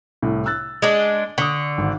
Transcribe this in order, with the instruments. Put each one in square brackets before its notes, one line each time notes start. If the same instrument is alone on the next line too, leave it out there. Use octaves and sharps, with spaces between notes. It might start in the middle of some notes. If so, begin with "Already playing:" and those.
[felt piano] C2 A2
E6 F#6 A6
[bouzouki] G#3 D4
[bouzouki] D3 [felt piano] C#6 D#6
[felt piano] G#1